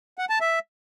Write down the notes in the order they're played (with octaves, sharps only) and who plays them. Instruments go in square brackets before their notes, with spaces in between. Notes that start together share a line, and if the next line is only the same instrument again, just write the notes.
[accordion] F#5
A5
E5